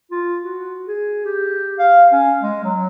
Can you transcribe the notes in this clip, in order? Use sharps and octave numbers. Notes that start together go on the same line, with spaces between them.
F4
F#4
G#4
G4
F5
C#4
G#3
F#3